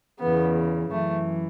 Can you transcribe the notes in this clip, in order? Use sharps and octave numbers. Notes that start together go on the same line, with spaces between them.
E2 C#3 E3 B3
F#2 E3 A3